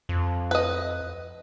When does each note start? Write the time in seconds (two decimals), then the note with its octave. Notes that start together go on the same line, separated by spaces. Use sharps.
0.09 F2
0.51 B4 D#5